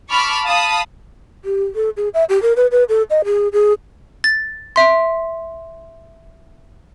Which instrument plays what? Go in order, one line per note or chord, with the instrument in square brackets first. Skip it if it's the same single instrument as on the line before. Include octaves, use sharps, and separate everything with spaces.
[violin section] A5 B5 C#6 D6 F6
F5 A5 B5 D#6
[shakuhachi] G4
A4
G#4
E5
G4
A#4
B4
B4
A4
D#5
G#4
G#4
[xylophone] A6
E5 C6